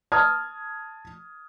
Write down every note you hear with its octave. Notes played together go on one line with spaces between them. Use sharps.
A5 D#6 F6 G#6